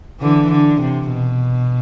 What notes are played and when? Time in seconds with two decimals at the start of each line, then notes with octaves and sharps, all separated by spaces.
0.21 D3 E3
0.51 D3
0.81 C3
1.10 B2